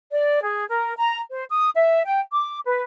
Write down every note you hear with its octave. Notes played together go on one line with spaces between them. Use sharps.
D5
G#4
A#4
A#5
C5
D#6
E5
G5
D6
B4